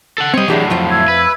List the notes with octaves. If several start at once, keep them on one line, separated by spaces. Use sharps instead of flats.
A4 F#5
G3 C4 C#5 D#5
A2 E3 F#3 D4 G4 G#4 E5
F2 F3 F4 F5
E5 E6 G#6
B4